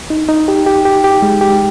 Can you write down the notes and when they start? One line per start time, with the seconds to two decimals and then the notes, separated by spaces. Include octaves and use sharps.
0.10 D#4
0.29 D#4
0.48 G4
0.66 G4
0.85 G4
1.04 G4
1.22 G#3
1.41 G4